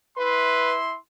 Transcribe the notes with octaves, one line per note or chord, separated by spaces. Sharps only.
E4 B4 E5 C6